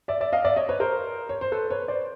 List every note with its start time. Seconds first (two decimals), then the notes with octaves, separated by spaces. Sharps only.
0.08 D5 E5
0.21 D5 E5
0.32 D#5 F5
0.44 D5 E5
0.56 C#5 D#5
0.69 B4 C#5
0.80 A#4 C5
1.29 C#5
1.41 C5
1.52 A4 B4
1.70 B4 C#5
1.88 C5 D5